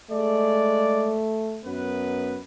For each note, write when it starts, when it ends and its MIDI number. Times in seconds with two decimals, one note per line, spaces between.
0.11 1.15 56
0.11 1.63 57
0.11 1.15 74
1.64 2.37 42
1.64 2.37 59
1.64 2.37 71